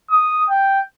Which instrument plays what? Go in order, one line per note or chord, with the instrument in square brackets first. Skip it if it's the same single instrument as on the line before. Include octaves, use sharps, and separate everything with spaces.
[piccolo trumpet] D#6
G5